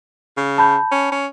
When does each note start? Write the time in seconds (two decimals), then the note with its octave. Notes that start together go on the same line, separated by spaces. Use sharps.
0.37 C#3
0.58 A5 B5 G6
0.91 C#4
1.12 C#4